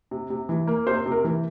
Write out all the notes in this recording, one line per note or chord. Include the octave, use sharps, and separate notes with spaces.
C3
C3
E3
A#3
C3 C5
C3
A#4
E3